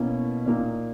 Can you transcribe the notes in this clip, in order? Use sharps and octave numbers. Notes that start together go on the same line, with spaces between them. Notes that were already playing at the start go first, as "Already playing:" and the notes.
Already playing: B2 A#3 C#4 E4
A#2 A#3 D#4